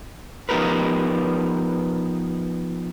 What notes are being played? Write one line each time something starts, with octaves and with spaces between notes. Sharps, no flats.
F3 B3 D#4 G4 A#4 B4